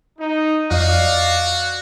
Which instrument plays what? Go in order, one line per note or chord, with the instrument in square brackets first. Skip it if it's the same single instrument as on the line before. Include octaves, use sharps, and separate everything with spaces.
[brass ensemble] D#4
[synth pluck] F2 D#5 [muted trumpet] F#4 [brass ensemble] D5 F5